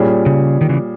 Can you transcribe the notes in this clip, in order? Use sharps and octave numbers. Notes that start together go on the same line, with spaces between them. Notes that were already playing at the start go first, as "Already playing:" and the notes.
Already playing: A#2 G3 C#4 G#4
C#3
D#3
C#3 E3